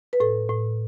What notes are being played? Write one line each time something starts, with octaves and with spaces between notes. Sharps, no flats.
B4
A2 A4
A2